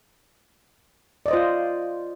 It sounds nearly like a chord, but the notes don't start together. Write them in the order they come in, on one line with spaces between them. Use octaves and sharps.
D5 D#5 C5 F4